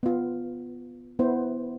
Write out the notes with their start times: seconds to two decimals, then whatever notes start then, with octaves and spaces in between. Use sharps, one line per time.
0.03 B3 F4
1.19 B3 E4 C5